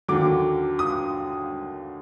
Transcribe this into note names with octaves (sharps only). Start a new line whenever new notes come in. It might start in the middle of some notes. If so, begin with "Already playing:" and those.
D#2 D3 F#3 D6
D#6